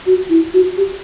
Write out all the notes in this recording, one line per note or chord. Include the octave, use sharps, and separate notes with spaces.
F#4
E4
F#4
G4